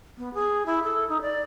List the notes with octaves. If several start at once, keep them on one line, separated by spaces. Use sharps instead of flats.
B3
G#4
E4
A4
D#4
D5